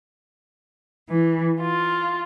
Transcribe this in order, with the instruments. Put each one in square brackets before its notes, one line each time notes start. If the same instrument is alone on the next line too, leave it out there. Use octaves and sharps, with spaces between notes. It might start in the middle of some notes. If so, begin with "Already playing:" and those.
[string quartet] E3
F4